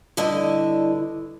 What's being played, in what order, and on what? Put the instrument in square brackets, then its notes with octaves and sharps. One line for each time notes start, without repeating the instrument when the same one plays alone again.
[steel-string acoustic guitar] G2 D3 E4 D#5